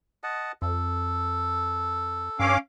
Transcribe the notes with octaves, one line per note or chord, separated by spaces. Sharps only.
D#5 F#5 A5
F2 A4
G2 C#4 F5 D6